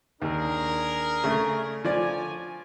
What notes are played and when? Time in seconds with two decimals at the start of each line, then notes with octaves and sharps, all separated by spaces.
0.22 D#2 D4 G#4 A#4
1.24 C#3 A3
1.84 D3 F3 C#5 D5 G#5